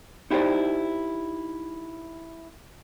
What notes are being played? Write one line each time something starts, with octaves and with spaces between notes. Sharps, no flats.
D#4 E4 G4 G#4 C5 D5